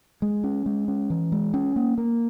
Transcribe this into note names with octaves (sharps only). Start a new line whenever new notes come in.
G#3
C#4
G#3
C#4
E3
G#3
C#4
A#3
A#3